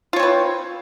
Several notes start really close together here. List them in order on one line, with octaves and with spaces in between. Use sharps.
F4 C#5 C4 B4